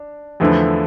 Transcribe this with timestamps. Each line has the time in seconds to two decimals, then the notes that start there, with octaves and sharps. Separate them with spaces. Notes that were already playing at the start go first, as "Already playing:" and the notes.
Already playing: D4
0.40 E2 D3 F3 A3 E4